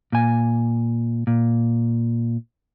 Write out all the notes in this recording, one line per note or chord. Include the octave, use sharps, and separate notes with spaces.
A#2 G#5
A#2